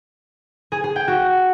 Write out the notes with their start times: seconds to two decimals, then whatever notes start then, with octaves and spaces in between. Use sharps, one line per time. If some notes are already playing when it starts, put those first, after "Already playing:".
0.72 G#4
0.84 G#4
0.96 G5
1.08 F#4